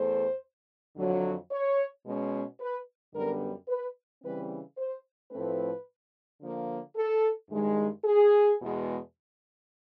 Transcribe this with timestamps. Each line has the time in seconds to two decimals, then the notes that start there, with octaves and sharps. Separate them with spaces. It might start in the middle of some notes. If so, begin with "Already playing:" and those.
Already playing: E2 A3 C5
0.96 F2 D3 F#3
1.51 C#5
2.04 B2 G#3 C#4
2.60 B4
3.14 F#2 D3 G3 B3 A#4
3.68 B4
4.22 C#3 E3 G3 C4 B4
4.77 C5
5.32 A2 F3 A3 C4 B4
6.41 D3 F3 A#3
6.96 A4
7.50 G2 D#3 G#3
8.04 G#4
8.59 E2 B2 G#3